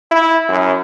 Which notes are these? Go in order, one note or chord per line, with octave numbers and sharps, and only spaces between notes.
E4
F#2